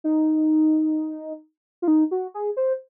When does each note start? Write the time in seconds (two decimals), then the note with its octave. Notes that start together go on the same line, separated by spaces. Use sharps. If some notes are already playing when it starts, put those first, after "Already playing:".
0.04 D#4
1.82 F4
1.88 D#4
2.11 F#4
2.34 G#4
2.57 C5